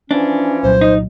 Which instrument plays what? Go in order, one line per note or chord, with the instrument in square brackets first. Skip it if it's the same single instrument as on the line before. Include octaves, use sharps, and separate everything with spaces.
[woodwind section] E3 F3 C#4 [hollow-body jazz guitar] D4
[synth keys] C2 A#2 F#3 [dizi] C5
[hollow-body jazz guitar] D#4